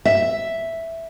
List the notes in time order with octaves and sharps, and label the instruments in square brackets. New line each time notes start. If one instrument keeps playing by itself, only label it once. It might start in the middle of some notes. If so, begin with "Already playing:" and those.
[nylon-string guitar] E5